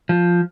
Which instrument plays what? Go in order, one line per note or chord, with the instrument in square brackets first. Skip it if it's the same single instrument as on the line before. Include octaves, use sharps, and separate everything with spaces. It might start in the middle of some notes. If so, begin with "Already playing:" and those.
[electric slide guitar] F3